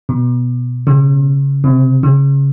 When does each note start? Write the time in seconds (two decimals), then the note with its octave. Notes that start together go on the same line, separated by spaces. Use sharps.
0.09 B2
0.87 C#3
1.64 C3
2.03 C#3